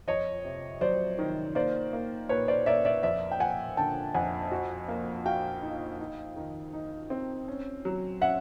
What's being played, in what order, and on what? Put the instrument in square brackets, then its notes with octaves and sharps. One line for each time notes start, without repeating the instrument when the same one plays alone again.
[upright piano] F2 [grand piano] C#5 D#5
[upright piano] C3
[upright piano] F#3 [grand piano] C5 D5
[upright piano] D#3
[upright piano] A#3 [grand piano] C5 D5
[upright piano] A#3
[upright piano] A#2 [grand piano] B4 C#5
[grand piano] C5 D5
[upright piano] A#3 [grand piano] D5 E5
[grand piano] D5 E5
[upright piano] F2 [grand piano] D5 E5
[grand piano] G5
[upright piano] F2 [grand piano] F#5 G#5
[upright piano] D3 [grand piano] G5 A5
[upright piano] F2 [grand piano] F#5 G#5
[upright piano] F#4
A#3
[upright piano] F#4 [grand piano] F5 G5
[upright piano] D#4
D#4
D#3
D#4
C4
C#4
F#3
[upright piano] C#4 [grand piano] E5 F#5